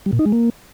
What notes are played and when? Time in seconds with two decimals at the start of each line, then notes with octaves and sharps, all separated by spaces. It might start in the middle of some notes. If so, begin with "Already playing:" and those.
0.06 G3
0.13 A#2
0.19 D#4
0.26 G#3
0.32 A#3